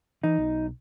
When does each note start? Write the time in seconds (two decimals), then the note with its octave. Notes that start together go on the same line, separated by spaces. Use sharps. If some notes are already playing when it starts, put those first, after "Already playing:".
0.23 E3 D#4
0.38 B1